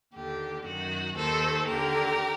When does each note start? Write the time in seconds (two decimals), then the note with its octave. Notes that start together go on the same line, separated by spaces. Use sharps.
0.15 D#2 D3 G4
0.66 F#2 D#3 F#4
1.16 D#2 D#3 A4 C5
1.68 D#2 D3 G4 A#4